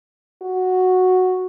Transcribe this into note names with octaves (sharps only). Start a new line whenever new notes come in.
F#4